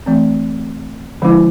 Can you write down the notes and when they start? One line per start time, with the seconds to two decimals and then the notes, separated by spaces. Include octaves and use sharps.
0.06 E3 A3 C4
1.22 D3 F3 G#3 C#4 E4